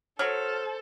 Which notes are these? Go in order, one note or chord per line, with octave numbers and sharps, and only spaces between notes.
F#3 A4 C5 F6